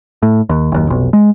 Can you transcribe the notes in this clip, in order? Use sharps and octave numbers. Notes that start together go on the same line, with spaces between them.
A2
D#2
F#1 D#2
F1 B1
G#3